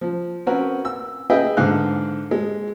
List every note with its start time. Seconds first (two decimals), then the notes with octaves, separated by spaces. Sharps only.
0.01 F3
0.46 C4 C#4 F#4 A#4 B4
0.85 E6
1.30 G#4 B4 D#5 E5 G5
1.57 G#2 D3 F5 F#6
2.31 G#3